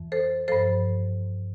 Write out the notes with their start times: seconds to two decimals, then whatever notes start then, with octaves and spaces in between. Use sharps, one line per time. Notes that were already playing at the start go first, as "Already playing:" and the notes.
Already playing: F2 E3
0.12 A4 C5
0.48 G2 F3 A4 C5